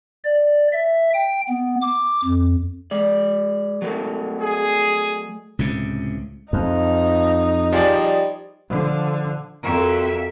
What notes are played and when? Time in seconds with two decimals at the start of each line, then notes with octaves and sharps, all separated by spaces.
0.24 D5
0.72 E5
1.14 G5
1.49 B3
1.82 D6
2.25 F2
2.91 G#3 D5
3.82 F#3 A3 A#4
4.41 G#4
5.59 C#2 A2 C3
6.53 F2 F3 D#4
7.73 F3 G3 G#4 D5
8.69 D3 F3
9.63 F2 F#3 A#4 E5